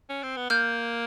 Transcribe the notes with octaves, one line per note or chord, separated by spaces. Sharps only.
C#4
C4
B3
A#3 F6 G6